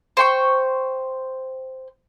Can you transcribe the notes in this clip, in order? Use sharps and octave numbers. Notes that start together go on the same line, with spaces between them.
C5 G5 C#6